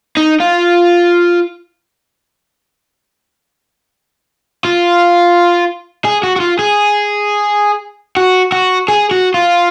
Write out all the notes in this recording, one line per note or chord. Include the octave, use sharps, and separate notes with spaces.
D#4
F4
F4
G#4
F#4
F#4
F4
G#4
F#4
F#4
G#4
F#4
F4